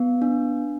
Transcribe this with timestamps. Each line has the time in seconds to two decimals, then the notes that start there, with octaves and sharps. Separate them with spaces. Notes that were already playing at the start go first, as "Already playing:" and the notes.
Already playing: B3
0.22 D4